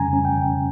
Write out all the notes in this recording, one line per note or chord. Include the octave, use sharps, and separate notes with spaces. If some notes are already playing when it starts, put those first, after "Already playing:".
Already playing: F2 C#3 G3 C#4 G#5 A#5
C#4
G5
C#3